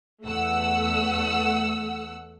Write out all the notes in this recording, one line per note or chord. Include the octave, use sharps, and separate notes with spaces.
E2 A3 F#5 E6